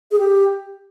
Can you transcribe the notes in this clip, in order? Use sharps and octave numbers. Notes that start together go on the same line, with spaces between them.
G#4
G4